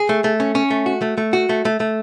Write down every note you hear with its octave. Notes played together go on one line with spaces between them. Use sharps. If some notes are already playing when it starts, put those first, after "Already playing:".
Already playing: G#4
A3
A3
C#4
C#4
A3
F#4
A3
A3
F#4
A3
A3
A3